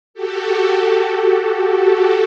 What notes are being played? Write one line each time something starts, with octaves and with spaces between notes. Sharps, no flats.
F#4 G4 A4